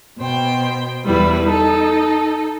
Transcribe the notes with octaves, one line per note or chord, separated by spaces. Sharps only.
B2 C5 G5
E2 G3 E4 B4
D#4 A4